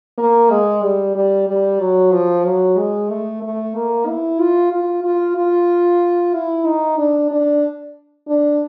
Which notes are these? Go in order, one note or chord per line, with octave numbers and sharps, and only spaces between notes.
A#3
G#3
G3
G3
G3
F#3
F3
F#3
G#3
A3
A3
A#3
E4
F4
F4
F4
F4
E4
D#4
D4
D4
D4